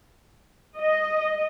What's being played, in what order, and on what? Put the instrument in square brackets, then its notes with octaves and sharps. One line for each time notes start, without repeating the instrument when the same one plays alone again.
[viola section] D#5